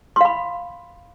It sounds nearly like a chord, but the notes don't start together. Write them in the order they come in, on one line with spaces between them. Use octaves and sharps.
C6 F5 B5